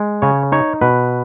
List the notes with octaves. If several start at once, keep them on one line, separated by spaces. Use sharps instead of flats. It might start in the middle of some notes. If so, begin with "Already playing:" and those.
Already playing: G#3
C#3 C#5
D#4 C#5
B2 B4